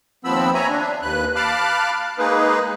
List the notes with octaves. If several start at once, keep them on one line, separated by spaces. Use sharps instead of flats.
D#2 F3 B3 C4 B5 E6
C#5 E5 G#5 A#5
D4
D#2 B4 F#6
F5 A5 B5 D6 F6 F#6
G#3 A#3 D#4 G#4 B4